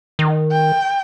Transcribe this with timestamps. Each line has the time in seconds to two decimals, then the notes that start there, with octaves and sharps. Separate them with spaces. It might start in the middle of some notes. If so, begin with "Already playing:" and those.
0.19 D#3
0.51 G5